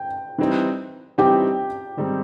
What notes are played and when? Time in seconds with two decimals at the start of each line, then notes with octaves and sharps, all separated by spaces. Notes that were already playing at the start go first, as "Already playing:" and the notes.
Already playing: G5
0.38 E3 G3 C4 D#4
1.18 E3 G3 C4 D#4 G4 G5
1.97 G#2 D#3 G3 C4 D#4